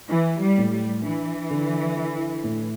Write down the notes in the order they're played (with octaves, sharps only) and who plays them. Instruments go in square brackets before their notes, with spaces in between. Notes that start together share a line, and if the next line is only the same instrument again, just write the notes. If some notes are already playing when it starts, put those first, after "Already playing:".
[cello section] E3 [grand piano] E4
[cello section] G3
[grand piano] A2
[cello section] G3
[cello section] E3 [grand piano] D4
[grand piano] D3
E4
A2